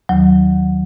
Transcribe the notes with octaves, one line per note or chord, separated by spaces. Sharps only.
D#2 D#3 F#3